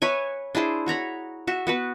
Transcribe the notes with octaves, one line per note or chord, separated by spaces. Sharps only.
B4 C#5 E5 G#5
D4 E4 G#4 C5
F#4 C#5 A#5 B5
F#4 E5
B3 F#4 B4